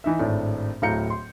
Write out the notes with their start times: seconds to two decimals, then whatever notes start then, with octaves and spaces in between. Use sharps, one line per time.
0.04 E3 D#4 E5
0.19 G#1 A2 D4
0.82 D1 A2 F5 A#5 G6 C#7
1.10 C6